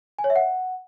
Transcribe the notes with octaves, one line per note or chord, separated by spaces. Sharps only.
G#5
C#5
E5
F#5